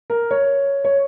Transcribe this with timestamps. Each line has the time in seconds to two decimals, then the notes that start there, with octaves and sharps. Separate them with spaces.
0.10 A#4
0.31 C#5
0.85 C#5